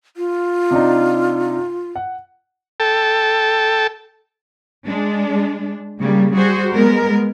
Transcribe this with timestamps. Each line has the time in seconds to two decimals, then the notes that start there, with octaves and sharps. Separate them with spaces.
0.17 F4
0.71 C3 D4 D#4
1.96 F#5
2.80 A4 G5 A5
4.85 G#3 D4
5.98 C#3 G3 A#3
6.32 G3 F#4 G#4 C5
6.72 G#3 B3 A#4